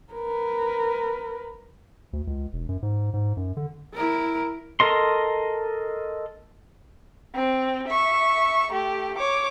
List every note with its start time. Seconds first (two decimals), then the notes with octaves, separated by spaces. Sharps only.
0.13 A#4 B4
2.13 D2
2.27 C#2
2.53 E1
2.69 F#2
2.82 G#2
3.14 G#2
3.37 F#2
3.57 D3
3.94 E4 A#4
4.80 A4 A#4 D#5 C6
7.35 C4
7.88 E5 C#6
8.72 A3 G4
9.18 C#5 D6